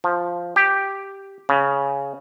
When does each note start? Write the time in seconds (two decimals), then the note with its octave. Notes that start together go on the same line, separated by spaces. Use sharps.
0.04 F3
0.56 G4
1.49 C#3